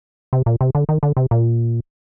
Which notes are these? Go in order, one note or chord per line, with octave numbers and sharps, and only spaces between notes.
C3
A#2
C3
D3
D#3
D3
C3
A#2